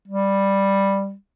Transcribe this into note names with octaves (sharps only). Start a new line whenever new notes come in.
G3